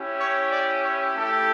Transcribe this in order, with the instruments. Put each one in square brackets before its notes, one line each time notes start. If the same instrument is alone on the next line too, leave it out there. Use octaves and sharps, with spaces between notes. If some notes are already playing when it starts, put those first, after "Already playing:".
Already playing: [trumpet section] C#4 E4 G4
C#5
D5
C#5
A3 E4 G4 A4